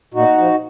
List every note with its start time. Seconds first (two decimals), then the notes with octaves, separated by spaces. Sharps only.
0.14 A#2 D#4 F#4
0.38 F3